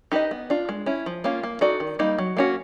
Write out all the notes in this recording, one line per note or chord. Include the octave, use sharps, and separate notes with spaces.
D#4 G4 B4 D#5
B3
D4 F4
G#3
C#4 E4
F3
A#3 C#4 F4
A#3
D#4 F#4 A4 D5
D#3
G3 A#3 D#4
F#3
A#3 C#4 F#4